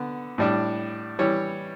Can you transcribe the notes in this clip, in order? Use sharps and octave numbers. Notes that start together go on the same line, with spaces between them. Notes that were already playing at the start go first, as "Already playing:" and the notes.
Already playing: D3 B3
A2 G3 D4
E3 G3 C#5